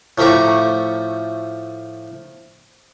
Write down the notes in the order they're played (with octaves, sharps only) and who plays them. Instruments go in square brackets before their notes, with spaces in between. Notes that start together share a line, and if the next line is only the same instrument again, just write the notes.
[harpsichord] A2 F3 A3 G4 A#5 C#6